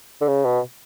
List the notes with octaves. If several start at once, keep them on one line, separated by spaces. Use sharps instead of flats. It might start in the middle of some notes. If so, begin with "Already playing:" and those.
D3
C#3
B2